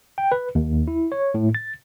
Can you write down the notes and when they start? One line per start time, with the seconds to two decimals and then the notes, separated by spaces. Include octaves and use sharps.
0.18 G5
0.32 B4
0.55 D#2
0.88 E4
1.12 C#5
1.34 A2
1.55 A6